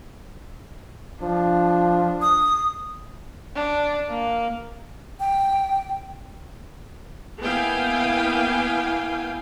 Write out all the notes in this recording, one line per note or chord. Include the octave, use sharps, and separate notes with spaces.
F3 D4
D#6
D4
A#3
G5
A#3 B3 E4 F5 G5 G#5